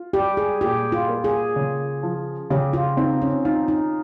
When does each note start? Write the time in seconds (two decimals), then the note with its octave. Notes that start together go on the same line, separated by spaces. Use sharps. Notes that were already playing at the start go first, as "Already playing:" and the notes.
Already playing: F4
0.13 G3 G4
0.37 G#4
0.61 A#2 G4
0.92 F4
1.08 A#3
1.24 G#4
1.56 C#3
2.03 F3
2.50 C#3 G4
2.73 F4
2.97 C4 D#4
3.22 C#4
3.45 D#4 F4
3.68 D#4